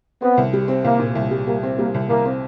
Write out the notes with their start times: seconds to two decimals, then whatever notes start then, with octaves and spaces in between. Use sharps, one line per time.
0.22 B3 C4
0.37 C2
0.53 G3
0.68 C4
0.84 C2 A#3
0.99 A#2
1.15 C2
1.31 G3
1.47 G3 A#3
1.63 C4
1.78 G3 A#3
1.94 C2
2.09 C2 A#3
2.25 C4